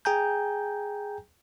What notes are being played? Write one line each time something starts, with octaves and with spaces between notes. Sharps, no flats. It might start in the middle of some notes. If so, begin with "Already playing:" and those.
G#4 G5 G#5 A#5 G6